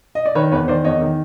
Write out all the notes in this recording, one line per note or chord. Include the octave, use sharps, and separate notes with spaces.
D#5
D5
D#3 B4 C#5
E2 B4 C#5
D#3 C5 D5
E2 C#5 D#5
D#3